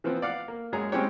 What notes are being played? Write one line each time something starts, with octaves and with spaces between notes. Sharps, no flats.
E3 F3 B3 C4
D5 F5 F#5
A#3
F#2 G#3 G#4 C#5 A#5
G#3 C4 C#4 E4 G4 C#5